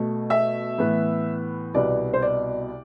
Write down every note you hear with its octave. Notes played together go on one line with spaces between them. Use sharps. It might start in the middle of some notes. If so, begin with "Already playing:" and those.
Already playing: B2 A3
E5
A2 E3 B3
C2 B2 B3 D5
C5
D5